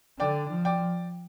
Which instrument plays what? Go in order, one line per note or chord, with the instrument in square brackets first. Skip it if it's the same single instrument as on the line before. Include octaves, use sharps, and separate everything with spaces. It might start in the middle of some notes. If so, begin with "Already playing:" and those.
[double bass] D3 [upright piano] D5 G5
[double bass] F3
[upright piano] D5 G5